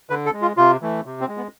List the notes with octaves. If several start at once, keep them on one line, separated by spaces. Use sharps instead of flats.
D3 B4
A4
G#3
F4
C3 F4
E3 A3
C3
C4
G#3
B3